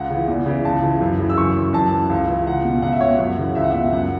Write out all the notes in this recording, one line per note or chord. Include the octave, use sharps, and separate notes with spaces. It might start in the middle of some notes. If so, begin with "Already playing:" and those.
Already playing: C#2 F#5
C#3 E3
E2
C#3 E3
C#2 A5
C#3 E3
F#2
C#3 E3
E6
F#2 C#6
E3
F#2 A5
E3
C#2
C#3 E3
C#2 F#5
B2
C#2 F#5
E5
B2 C#5
F#5
F#2
C#3 E3
C#2 E5
F#5
E5
B2
F#2 F#5